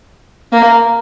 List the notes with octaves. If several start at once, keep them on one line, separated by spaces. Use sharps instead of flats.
A#3